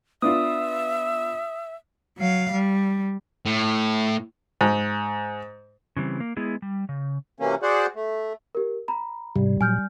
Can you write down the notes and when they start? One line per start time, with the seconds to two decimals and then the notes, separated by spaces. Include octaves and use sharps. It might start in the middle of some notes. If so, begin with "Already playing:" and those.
0.22 B3 D4 F4 E5 D#6
2.18 F#3 F5
2.52 G3
3.46 A2
4.61 G#2
5.97 C#3 E3 G3 C4
6.20 A#3
6.37 G#3 B3 E4 G#4
6.62 G3
6.89 C#3
7.40 C3 E3 F#3 A#3 C#4
7.62 F#4 G#4 C5 D5 F#5
7.95 A3
8.55 G4 A#4
8.88 A#5 B5
9.36 G#2 C3 G3
9.61 A#2 F#3 G#5 F6 G6